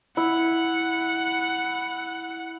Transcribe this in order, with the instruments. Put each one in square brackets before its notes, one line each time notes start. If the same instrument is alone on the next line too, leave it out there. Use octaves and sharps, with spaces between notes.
[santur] E4 [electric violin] F#5